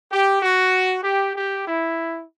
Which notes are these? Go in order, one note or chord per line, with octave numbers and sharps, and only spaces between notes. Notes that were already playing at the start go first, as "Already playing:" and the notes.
G4
F#4
G4
G4
E4